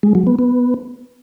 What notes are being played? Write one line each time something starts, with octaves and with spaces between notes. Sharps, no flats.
G#3
F#3
B3
B3